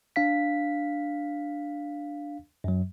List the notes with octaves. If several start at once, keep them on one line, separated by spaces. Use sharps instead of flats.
D4 F5 B6
F#2 F#3